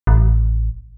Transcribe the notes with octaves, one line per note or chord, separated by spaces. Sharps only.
A1